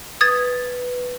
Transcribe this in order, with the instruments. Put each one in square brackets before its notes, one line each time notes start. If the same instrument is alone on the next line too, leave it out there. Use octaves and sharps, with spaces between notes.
[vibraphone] B4 [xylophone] D#6 G#6 A6